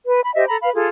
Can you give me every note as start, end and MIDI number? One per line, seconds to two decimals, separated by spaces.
0.06 0.20 71
0.22 0.31 83
0.35 0.45 67
0.35 0.45 72
0.35 0.45 75
0.35 0.45 76
0.48 0.56 69
0.48 0.56 82
0.48 0.56 83
0.61 0.71 71
0.61 0.71 77
0.61 0.71 83
0.73 0.88 65
0.73 0.88 68
0.73 0.88 69